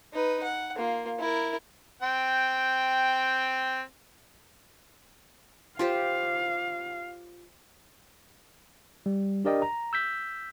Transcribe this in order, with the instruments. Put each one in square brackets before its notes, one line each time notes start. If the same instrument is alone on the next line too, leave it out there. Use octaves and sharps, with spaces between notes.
[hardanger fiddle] D#4 B4
F#5
A#3 F4
E4 A#4
[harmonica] C4 G5
[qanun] F4 G4 C5 [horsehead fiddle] F5
[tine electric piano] G3
D4 G4 A#4 D5 D#5 G5
A#5
E6 G6 B6